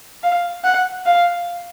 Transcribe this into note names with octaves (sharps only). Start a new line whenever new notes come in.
F5
F#5
F5